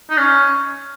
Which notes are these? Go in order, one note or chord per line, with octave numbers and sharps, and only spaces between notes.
D#4
C#4